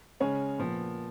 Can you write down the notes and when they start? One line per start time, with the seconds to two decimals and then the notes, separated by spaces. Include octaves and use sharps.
0.20 C#3 G#3 C#4 G#4 C#5
0.58 A#2 F3 B3